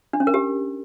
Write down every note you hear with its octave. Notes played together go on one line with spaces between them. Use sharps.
D4
C#4
A#4
G4